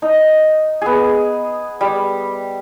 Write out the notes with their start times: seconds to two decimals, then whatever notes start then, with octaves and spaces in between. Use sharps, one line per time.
0.02 D#4
0.82 B3 G#4
1.81 G3